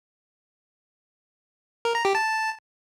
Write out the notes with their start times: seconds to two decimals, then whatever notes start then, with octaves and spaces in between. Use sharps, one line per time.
1.85 A#4
1.95 A#5
2.05 G4
2.15 A5